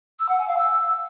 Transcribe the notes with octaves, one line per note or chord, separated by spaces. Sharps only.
E6
F#5
G#5
F5
E6